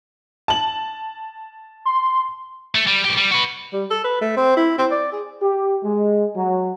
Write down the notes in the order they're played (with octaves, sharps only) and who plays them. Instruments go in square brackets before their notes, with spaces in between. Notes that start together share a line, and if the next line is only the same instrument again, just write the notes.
[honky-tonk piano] A5 F#7
[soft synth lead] C6
[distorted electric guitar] A3
G3
B1 G4
G3
F#4 B4
[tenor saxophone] G3
A4
B4
A3
C4
E4
C4
D5
G#4
[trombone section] G4
G#3
F#3